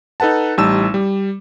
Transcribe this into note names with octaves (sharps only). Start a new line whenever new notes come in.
D#4 A4 B4 F#5 A5
A1 G3 D#4 A5 E6 E7
G3